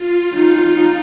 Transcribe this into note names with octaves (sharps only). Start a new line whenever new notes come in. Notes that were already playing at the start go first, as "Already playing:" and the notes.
Already playing: F4
D#4